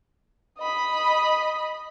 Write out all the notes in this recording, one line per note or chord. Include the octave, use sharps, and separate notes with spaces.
D#5 B5